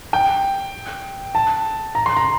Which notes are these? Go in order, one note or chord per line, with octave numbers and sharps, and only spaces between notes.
G5
A5
A#5
C6
A#5